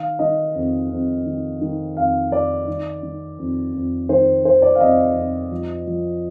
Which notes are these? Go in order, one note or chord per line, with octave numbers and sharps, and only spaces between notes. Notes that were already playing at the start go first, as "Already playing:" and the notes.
Already playing: D#3 F5
D#3 D#5
F2
F2
D#3
D#3
F2 F5
F2 D5
D#3
D#3
F2
F2
D#3 C5
D#3 C5
D5
F5
F2 D#5
F2
F3
F3